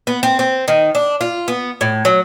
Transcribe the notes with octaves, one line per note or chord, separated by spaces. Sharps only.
B3
C4
C4
D#3
D4
F4
B3
A2
F#3